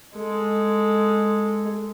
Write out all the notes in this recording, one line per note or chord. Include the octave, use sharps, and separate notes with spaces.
G#3 A4